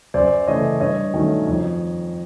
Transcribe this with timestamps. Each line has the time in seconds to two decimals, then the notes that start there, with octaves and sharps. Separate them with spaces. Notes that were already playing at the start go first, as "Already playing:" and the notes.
0.14 F#2 C5 D5
0.47 C#3 E3 A3 C#5 D#5
0.81 G2 C#5 D#5
1.14 D#3 F#3 A3 C#4
1.47 F2